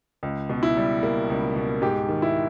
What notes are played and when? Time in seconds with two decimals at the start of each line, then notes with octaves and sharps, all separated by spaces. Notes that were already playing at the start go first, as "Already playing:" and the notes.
0.23 C#2
0.50 B2
0.63 E4
0.77 G3
1.03 A#3
1.30 C#2
1.56 B2
1.82 G#2 G4
2.09 D#3
2.22 E4